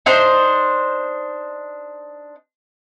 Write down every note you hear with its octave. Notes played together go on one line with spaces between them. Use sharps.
D4 D#4 C5